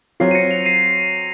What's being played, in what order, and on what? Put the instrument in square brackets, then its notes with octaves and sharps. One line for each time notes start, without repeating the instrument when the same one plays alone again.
[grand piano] F#3 C4 F4 [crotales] C7
[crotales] D#7
A#6 C#7
C#7 F7
C7 D#7